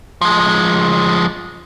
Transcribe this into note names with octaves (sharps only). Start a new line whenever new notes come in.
F3 G#3